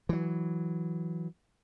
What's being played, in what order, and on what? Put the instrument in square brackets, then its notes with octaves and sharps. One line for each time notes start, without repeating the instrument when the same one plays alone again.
[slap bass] E3 F#3